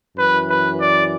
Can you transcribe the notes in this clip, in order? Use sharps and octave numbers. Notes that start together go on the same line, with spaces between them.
F#2 E3 B4
B4
D5